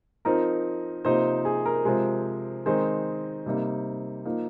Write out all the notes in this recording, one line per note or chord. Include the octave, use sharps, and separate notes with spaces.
F3 C4 D#4 A#4
C3 F3 A#3 D#4 C5
G#4
A#4
C3 F3 G#3
D#3 G#3 C4 D#4 C5
C3 G3 A#3 D#4
F3 A#3 D#4